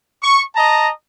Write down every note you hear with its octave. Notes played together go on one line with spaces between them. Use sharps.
C#6
D#5 A5 A#5